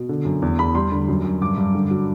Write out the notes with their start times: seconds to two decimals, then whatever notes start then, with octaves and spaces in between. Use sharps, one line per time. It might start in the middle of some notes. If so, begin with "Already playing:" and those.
Already playing: B2
0.09 D3
0.25 F#2
0.42 E2
0.59 E2 B5
0.75 G3 C6
0.92 D3
1.08 F#2
1.25 F#2
1.41 G2 D6
1.57 G2
1.75 D3
1.91 F#3